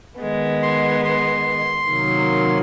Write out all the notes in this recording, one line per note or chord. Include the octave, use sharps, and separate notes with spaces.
D#3 G#3 B3
C6
C6
C3 D#3 F#3 A#3